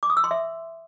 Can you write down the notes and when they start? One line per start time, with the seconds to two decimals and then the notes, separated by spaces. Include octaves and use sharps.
0.03 D6
0.10 D#6
0.17 E6
0.24 C6
0.31 E5